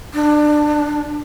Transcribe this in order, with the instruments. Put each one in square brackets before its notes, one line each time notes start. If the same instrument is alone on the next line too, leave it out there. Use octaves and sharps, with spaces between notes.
[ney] D4